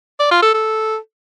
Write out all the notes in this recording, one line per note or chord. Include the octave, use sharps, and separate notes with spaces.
D5
F4
A4
A4